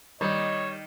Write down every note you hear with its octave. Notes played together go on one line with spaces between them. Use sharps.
D#3 G3 C#5 D#5